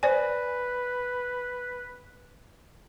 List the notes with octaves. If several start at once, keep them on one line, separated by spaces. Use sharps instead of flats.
B4 C5 D5 G#5